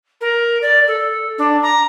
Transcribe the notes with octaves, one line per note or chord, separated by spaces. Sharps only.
A#4
D5
A4
D4
A#5